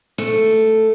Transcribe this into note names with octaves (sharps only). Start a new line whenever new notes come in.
A3